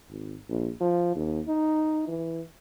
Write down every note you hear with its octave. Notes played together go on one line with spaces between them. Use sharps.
G#1
A#1
F3
D#2
D#4
E3